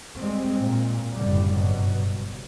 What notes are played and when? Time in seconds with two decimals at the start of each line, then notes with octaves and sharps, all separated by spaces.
0.17 G3 G#3 C4
0.58 A#2
1.13 F#1 A2 D3 G3
1.55 G2 B2 F#3
2.10 G1